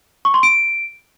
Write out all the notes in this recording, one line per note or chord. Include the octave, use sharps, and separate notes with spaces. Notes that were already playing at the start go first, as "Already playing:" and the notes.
C#6
C6
D7